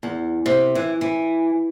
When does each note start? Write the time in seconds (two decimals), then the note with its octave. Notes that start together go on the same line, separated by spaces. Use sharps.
0.03 E2
0.46 C3
0.75 E3
1.01 E3